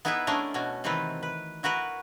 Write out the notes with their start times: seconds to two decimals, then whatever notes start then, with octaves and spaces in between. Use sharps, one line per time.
0.05 B3 D#4 E4 G#4 B4 E5
0.27 A3 C#4 D4 G#4 A#4
0.54 B2 C#4 F#4
0.84 C3 D#3 E3 C4 E4 B4
1.23 B4
1.63 E4 F#4 A#4 B4 F#5